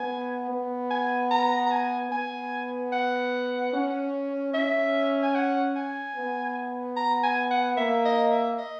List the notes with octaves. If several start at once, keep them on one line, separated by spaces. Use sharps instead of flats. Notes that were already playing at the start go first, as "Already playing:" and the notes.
Already playing: B3 G#5
B3
G#5
A#5
A#5
G#5
B3 G#5
F#5
C#4
C#4 E5
G#5
F#5
G#5
B3
A#5
G#5
F#5
A#3 E5
D#5
E5
D#5